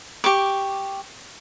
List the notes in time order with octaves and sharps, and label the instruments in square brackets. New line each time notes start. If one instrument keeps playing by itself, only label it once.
[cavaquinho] G4 C#6 D6